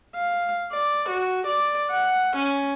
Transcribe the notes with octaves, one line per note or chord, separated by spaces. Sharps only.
F5
D5
F#4
D5
F#5
C#4